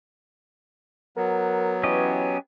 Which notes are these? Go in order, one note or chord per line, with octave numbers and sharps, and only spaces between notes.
F#3 B3 A#4
E3 C#4 G4 D#5